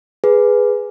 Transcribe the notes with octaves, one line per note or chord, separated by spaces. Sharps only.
G#4 B4